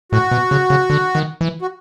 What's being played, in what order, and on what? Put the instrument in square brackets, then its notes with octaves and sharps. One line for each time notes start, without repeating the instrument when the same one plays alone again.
[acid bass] A2 [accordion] F#4
[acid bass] B2
C#3
C#3
D3
D#3
E3
[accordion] F#4